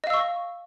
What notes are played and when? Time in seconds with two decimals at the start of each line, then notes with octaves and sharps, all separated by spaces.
0.04 D#5
0.07 F5
0.10 E6
0.14 C#6